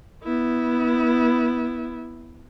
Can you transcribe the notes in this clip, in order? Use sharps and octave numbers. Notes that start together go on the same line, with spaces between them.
B3 E4